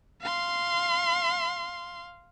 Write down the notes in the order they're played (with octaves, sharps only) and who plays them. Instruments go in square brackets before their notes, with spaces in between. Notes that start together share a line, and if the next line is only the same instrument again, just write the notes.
[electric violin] F5 C6